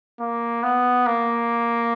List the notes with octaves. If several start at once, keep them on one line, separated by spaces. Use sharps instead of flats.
A#3
B3
A#3